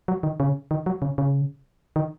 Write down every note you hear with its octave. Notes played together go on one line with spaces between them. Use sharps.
F#3
D#3
C#3
D#3
F#3
C#3
C#3
D#3